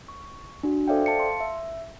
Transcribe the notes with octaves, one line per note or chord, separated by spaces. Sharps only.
C#6
D4 F#4
A4 C5 D5 E5 F5 G5
F5 A5 C#7
C6
E5